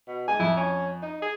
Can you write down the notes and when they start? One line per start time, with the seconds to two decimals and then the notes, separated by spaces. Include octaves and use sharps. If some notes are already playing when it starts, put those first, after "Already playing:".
0.08 B2
0.28 G#3 G#5
0.40 F2 E4
0.56 C#4
1.02 D#4
1.22 G#4